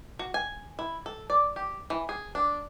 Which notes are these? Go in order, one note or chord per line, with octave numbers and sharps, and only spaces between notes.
F#4
G#5
E4
A4
D5
G4
E3
G#4
D4